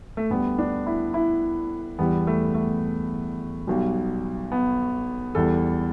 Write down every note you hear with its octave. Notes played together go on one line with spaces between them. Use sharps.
A3
D2 D3 G3 B3
D4
E4
E4
E2 E3 G3 B3
A3
A3
B1 B2 G3
B3
E2 E3 G3 A4